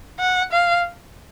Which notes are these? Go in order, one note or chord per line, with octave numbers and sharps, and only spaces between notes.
F#5
F5